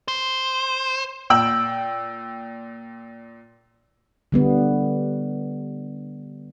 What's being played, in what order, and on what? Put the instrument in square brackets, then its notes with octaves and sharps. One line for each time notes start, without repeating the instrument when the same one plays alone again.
[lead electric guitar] C5
[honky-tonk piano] A#2 G5 E6 F#7
[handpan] D3 G3 B3